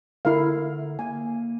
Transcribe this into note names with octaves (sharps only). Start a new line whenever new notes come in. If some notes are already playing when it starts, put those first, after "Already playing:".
D3 E4 A#4 F5
A#3 G#5